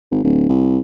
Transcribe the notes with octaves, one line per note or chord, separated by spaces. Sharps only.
G#1
D1
C2